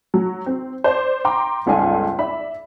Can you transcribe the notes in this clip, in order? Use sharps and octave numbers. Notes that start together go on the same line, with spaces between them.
F#3
C4
C5 D5
G5 A#5 C6 D6
G1 C#2 A4 D5 F5 G#5
D5 E5 B5